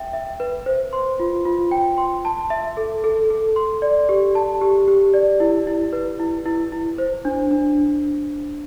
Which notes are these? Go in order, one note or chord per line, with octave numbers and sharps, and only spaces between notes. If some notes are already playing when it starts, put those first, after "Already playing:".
Already playing: E5 G5
E5
B4
C5
C6
F4
F4
G5
C6
A5
E5
A4
A4
A4
C6
D5
G4
A5
G4
G4
D5
E4
E4
B4
E4
E4
E4
C5
D4
D4